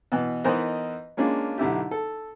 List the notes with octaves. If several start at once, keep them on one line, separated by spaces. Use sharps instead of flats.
B2 E3
E3 B3 D#4 A#4 C5 D#5
G#3 A#3 C#4 D4 F4
B1 D3 E4 G4
A4